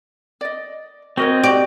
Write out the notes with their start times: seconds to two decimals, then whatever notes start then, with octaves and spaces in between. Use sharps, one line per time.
0.41 D5 D#5
1.17 C4 F#4 A#4 C#5 D#5
1.44 F#4 G4 D5